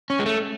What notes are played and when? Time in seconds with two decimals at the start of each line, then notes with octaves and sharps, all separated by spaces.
0.10 C#4
0.19 G#3
0.26 A3